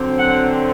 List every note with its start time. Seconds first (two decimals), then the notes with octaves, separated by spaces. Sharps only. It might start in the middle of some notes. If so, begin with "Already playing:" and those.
Already playing: D3 F#3 C4
0.18 F#5